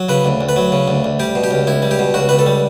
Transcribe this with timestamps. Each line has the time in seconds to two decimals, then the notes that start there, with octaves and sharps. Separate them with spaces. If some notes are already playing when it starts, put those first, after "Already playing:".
Already playing: F#3
0.09 C#3 B4
0.25 D2
0.41 D2
0.49 B4
0.56 F#3
0.72 C#3
0.88 D2
1.04 D2
1.20 G3 G4
1.35 B2
1.44 G4
1.51 C#2
1.67 C#2 E4
1.82 G3
1.91 G4
1.99 B2
2.14 C#2 F#4
2.29 C#2 B4
2.39 A4
2.46 G3